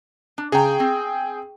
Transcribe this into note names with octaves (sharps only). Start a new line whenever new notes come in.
D4
C#3 G#4 G5 A#5
C4